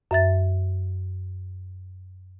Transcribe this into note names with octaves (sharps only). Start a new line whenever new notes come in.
F#2 E5 A6